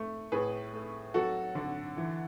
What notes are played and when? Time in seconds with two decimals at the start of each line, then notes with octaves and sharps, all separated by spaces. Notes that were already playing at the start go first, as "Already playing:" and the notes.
Already playing: A3
0.32 A2 G#4 B4
0.73 A3
1.14 F#3 F#4 A4
1.55 D3
1.97 E3